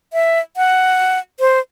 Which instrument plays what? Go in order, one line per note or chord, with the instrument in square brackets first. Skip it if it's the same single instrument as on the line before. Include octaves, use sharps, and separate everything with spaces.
[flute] E5
F#5
C5